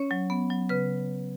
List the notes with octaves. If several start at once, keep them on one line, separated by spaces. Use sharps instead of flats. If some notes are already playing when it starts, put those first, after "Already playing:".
Already playing: C#4 C#5
F#3
B3
F#3
C#3 B4